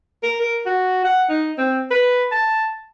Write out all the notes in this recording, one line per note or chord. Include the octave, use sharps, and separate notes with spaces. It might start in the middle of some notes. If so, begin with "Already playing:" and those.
A#4
A#4
F#4
F#5
D#4
C4
B4
A5